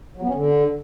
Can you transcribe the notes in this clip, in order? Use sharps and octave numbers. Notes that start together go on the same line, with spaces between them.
F#3
B3
C#4
D3